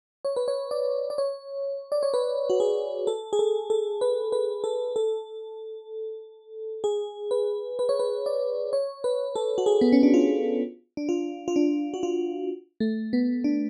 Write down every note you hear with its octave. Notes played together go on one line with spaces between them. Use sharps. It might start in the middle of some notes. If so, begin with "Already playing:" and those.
C#5
B4
C#5
D5
D5
C#5
D5
C#5
B4
F#4
G#4
A4
G#4
A4
A4
B4
B4
A4
A4
G#4
B4
B4
C#5
B4
D5
C#5
B4
A4
F#4
G#4
B3
C#4
D4
F4
D4
F4
F4
D4
F#4
F4
A3
B3
D4